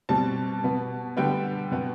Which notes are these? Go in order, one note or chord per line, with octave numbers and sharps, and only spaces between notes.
B2 G3 C4 A5
B2 B3
D3 G3 B3 G5
B2 B3